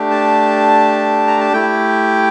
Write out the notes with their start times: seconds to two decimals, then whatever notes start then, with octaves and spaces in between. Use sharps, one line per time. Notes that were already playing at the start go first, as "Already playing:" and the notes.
Already playing: A3 D4 G4
0.11 A5
1.27 A#5
1.40 A5
1.53 A3 E4 G4 G5